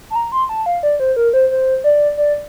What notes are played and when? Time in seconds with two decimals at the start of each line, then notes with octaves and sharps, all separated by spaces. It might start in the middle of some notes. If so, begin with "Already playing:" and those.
0.10 A5
0.15 A#5
0.32 C6
0.49 A5
0.66 F5
0.83 D5
1.00 C5
1.16 A#4
1.33 C5
1.51 C5
1.84 D5
2.17 D5